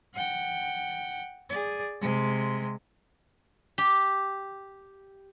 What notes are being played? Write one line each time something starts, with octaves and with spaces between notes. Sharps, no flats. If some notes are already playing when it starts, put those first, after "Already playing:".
F#5 G5
G#4 D5
C3 G#3
G4